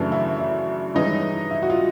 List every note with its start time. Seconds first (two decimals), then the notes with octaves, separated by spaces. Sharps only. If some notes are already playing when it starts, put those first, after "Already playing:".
Already playing: F#2 C#3 E3 A3 D4
0.12 E4
0.39 E4
0.95 G2 E3 G#3 C#4 D#4
1.51 E4
1.62 F#4
1.70 F4